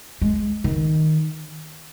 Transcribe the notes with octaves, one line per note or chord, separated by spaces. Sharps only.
G#3
D#3